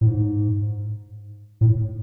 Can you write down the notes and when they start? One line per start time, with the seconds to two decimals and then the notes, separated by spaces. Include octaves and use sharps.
0.01 A2
0.07 G#2
1.61 A2